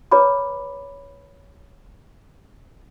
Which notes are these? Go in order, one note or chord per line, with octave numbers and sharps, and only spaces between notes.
G#4 B4 C#5 A#5 B5 D6